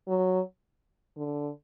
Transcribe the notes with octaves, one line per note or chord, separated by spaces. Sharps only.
F#3
D3